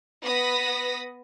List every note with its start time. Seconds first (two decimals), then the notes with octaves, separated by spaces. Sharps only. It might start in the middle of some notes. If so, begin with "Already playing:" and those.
0.24 B3 B4 D#6 A#6 B6